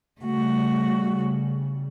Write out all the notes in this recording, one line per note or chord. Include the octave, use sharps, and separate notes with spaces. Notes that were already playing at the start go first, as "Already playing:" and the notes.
C#3 G3 A3 F#4